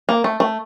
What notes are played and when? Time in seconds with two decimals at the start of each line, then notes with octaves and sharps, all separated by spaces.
0.09 A#3
0.24 A3
0.40 A3